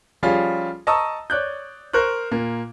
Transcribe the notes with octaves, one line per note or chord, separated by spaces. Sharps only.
F3 G3 C#4 F4 G#4
D#5 A5 A#5 C#6 D#6 E6
C#5 D5 F#6 G6
A#4 C5 C#6 F#6
A#2 A#3